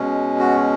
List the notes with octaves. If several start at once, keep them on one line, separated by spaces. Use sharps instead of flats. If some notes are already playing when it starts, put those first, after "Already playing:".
Already playing: B2 G#3 C#4
F#4